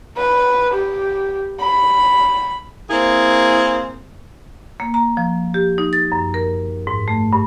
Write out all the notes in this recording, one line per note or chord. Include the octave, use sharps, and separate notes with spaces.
B4
G4
B5
A#3 C4 E4 G#4
A#3
A#5
F3
G4
D#4
A6
F#2
A#4
G#2
A3
G2